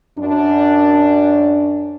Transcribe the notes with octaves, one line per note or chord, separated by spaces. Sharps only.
F#2 D4